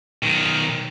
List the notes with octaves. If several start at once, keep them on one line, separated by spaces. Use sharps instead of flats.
B1 D#3